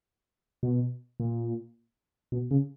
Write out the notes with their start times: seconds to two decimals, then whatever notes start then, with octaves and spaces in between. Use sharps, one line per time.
0.63 B2
1.20 A#2
2.32 B2
2.51 C#3